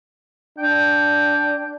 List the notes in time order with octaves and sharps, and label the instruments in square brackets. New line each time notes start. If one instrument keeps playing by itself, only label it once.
[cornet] D4 [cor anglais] G5